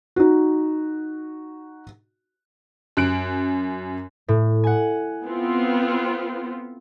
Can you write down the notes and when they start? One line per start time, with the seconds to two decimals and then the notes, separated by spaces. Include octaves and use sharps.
0.16 D#4 F#4
2.97 F#2 F#6 D7
4.28 A2
4.64 F#5 G#5
5.23 B3 C4 F4